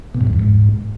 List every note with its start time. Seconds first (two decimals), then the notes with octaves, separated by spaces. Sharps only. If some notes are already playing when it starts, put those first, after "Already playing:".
0.15 B2
0.21 G2
0.27 F#2
0.33 E2
0.39 G#2